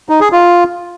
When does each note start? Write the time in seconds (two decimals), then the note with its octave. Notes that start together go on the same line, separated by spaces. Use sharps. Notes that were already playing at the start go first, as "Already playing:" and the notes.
0.09 D#4
0.21 G#4
0.32 F4